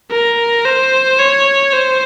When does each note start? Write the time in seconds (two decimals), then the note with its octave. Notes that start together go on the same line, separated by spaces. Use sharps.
0.11 A#4
0.65 C5
1.19 C#5
1.73 C5